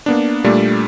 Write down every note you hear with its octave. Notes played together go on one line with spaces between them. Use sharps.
A#3 B3 D4
A#2 G3 A3 D4